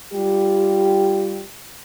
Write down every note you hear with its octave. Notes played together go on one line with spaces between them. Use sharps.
G3 F4 G4